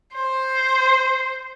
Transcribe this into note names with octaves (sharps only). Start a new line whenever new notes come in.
C5